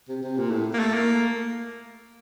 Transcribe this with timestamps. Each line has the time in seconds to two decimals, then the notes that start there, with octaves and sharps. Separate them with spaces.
0.09 C3
0.23 C3
0.37 A#2
0.51 A2
0.73 A#3
0.79 A3
0.94 A#3